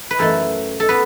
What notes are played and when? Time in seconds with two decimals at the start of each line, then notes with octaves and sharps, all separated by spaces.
0.11 B4
0.19 F#2 E3 A3 A4
0.80 A4
0.89 B3 B4